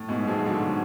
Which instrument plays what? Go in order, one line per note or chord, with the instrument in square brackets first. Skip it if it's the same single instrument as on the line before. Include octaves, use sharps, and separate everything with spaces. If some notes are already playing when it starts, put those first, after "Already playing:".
Already playing: [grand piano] A2
G#2 B2
F#3
F3 G#3
D3 F#3